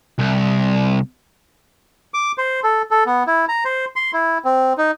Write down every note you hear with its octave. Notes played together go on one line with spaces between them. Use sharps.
C2
D6
C5
A4
A4
B3
E4
A#5
C5
C6
E4
C4
D#4